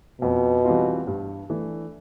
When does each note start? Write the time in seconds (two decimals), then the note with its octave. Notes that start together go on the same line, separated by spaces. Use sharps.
0.22 F2 B2
0.64 E3 G3 C4 F4
1.07 G2
1.50 E3 A3 D4